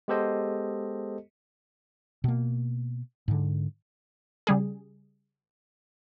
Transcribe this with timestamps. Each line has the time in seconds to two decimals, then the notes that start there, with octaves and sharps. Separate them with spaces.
0.08 G#3 B3 G4 A4 C5 D#5
2.24 B2 A#3
3.28 G#2 D3
4.47 C#3 G3 G#4